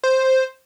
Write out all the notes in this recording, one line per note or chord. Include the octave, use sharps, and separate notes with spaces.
C5